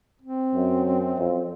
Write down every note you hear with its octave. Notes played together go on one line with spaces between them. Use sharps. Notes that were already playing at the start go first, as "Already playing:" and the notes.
C4
F#2
F2